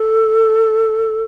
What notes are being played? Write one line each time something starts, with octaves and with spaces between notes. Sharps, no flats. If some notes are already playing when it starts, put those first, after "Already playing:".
Already playing: A4